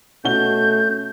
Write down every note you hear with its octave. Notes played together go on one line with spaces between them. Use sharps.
B2 A3 C#4 F#4 G6 G7